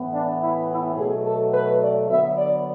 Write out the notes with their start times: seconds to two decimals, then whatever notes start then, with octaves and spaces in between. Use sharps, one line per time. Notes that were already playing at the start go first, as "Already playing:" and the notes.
Already playing: A2 E3 B3
0.11 D4
0.39 E4
0.68 E4
0.96 B2 F#3 A3 G#4
1.24 A4
1.52 B4
1.81 D5
2.09 D3 F#3 B3 E5
2.36 D5